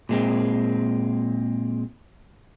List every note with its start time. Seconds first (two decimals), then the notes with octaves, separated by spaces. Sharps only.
0.09 A#2 G#3 C4